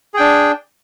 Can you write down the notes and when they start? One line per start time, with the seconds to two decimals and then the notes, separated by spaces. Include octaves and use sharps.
0.14 G#4
0.17 G5
0.20 D4